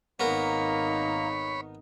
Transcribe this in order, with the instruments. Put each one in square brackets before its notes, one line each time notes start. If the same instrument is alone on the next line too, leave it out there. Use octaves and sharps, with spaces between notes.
[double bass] G#1 D#4 [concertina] A#3 A#5 [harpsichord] B3 A#4 [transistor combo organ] C#5 B5